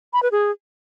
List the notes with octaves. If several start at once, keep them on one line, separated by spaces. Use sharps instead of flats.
B5
B4
G#4